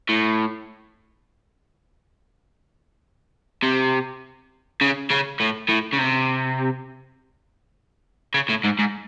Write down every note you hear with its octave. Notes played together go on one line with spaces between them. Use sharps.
A2
C3
C#3
C#3
A2
A2
C#3
C3
C#3
A2
G#2
G#2